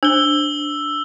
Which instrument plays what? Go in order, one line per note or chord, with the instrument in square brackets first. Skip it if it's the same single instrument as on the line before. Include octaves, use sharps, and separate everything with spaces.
[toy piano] D4 C5 [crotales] E6 G7